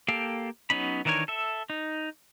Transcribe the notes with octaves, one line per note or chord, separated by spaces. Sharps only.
A#3 G4 A4 F5 G5
F#3 B3 C#4 D#4 B5
D#3 E3 D4 A#4 C#5
A4 E5
D#4